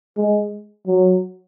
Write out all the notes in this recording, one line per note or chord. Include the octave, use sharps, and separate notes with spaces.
G#3
F#3